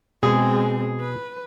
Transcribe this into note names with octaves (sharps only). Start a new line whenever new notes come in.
B2 G#3 C4 G#4
B4